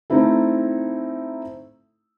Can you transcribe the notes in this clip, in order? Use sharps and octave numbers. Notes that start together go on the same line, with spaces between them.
A3 C4 D#4 E4 A4